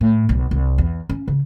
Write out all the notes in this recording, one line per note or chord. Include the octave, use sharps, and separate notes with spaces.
A2
B1
C2
E2
C#4
C#3